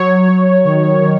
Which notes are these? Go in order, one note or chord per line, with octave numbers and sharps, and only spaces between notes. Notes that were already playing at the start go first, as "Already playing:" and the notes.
Already playing: F#3 C#5
F#3
D#3
D#3